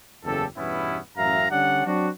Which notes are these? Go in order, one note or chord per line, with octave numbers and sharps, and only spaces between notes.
F#1 E2 C#3 G4 A4
E2 G2 B2 B3 C#4 E4
A1 F#2 E5 F5 A#5
D3 G3 C#4 D4 F#5
F#3 C4 D4 F#4